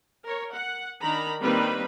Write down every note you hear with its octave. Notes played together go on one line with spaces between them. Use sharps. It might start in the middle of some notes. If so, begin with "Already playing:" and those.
A#4 C#5
F#5
D#3 D4 A#5 B5
D#3 G3 A#3 C4 B4 B5